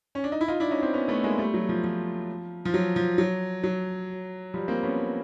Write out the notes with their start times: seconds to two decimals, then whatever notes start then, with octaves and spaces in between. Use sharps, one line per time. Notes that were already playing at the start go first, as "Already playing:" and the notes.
0.15 C#4
0.24 D4
0.32 D#4
0.41 E4
0.48 D#4 F4
0.60 D4 E4
0.71 C#4 D#4
0.82 C4 D4
0.93 B3 C#4
1.08 A3 B3
1.23 G#3 A#3
1.38 G3 A3
1.54 F#3
1.69 F3
1.84 F3
2.65 F3
2.74 F#3
2.96 F3
3.18 F#3
3.63 F#3
4.54 F3 G3
4.68 A#3 C4
4.83 B3 C#4